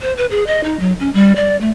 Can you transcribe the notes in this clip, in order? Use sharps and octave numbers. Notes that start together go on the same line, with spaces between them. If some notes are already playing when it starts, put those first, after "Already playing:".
C5
B4
G#4
D#5
D#4
F#3
C#4
G3
D5
A3